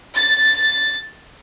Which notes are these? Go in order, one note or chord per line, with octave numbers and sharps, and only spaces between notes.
A6